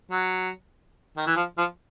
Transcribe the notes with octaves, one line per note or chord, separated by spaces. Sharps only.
F#3
D#3
E3
F3
F3